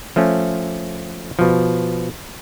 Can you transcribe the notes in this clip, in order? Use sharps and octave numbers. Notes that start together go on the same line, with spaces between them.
F3 A3 C#4
B2 F3